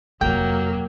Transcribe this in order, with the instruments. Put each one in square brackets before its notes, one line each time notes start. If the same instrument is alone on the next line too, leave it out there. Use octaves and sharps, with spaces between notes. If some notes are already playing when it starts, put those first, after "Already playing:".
[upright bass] F2 C3 [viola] F#3 A#3 [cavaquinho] G5